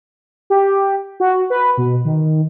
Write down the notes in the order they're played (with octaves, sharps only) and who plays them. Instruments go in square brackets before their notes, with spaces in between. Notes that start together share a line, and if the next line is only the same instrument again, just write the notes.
[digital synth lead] G4
F#4
B4
B2
D#3